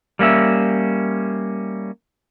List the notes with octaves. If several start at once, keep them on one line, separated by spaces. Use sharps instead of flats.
G3 A#3 C#4 E5